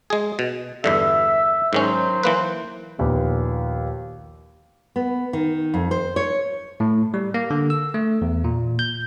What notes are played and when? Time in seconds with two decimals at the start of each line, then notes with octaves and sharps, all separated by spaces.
0.10 G#3 G#4
0.39 B2
0.84 E2 G2 D3 E5
1.73 G#2 D#3 F#3 C#4 C5
2.23 E3 A#3 B4
2.98 A#1 D#2 A#2 B3
4.96 B3
5.33 D#3
5.74 F2
5.91 C5
6.16 C#5
6.80 A2
7.14 G3
7.34 A#3
7.50 D3
7.70 E6
7.94 A3
8.22 E2
8.44 A#2
8.79 G6